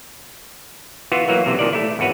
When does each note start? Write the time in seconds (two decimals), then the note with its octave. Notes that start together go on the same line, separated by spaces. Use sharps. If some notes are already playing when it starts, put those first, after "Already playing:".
1.12 E3 B3 F4 F#4
1.28 E3 F#3 A#3
1.46 B1 C3 E3
1.59 A#2 D#3 D5
1.73 A3 E4
1.99 G#1 E2 F#4 B4 C#5